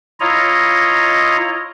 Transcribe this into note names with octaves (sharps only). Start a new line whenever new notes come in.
E4 F4 C#5 D#5 A#5